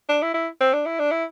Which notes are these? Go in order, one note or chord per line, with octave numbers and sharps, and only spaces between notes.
D4
E4
E4
C4
D4
E4
D4
E4